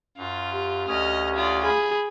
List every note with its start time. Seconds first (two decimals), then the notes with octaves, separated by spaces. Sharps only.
0.17 F#2 F4
0.52 G4
0.88 D2 C#4 D#5 D#6 F6
1.35 F4 D5
1.64 G#4 B5